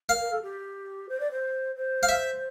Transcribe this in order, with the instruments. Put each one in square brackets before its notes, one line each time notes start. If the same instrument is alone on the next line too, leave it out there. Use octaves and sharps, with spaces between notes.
[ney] A#4 [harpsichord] F5
[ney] A#4
A4
G4
C5
D5
C5
C5
[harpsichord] F5
E5